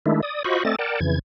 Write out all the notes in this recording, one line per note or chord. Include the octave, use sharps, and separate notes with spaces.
D#3 G#3 A3 D4 E4
D5 D#6
F4 F#4 C5 D#5 B5 C#6
A3 C4 A4 D5 D#5 A6
A#4 D5 F#5 G5 A5
F2 C#3 E3 G#6